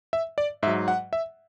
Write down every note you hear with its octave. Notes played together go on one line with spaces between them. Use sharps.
E5
D5
G#2 F#3 E5
F#5
E5